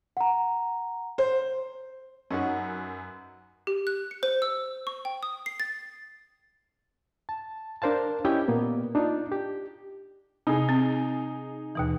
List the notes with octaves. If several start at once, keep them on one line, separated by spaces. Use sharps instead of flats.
F#5 A#5
C5
F#2 C#4 D#4 F#4 B4 F#5
G4
F#6
C#7
C5
E6
C#6
G5
D#6
C7
A6
A5
D4 A#4 C5 F5 A5
C#4 E4 G4 D#5 E5 G5
A#2 A#3 B3
D4 D#4 F4
G4
C3 D#4 G#4
C4
D#2 B2 E3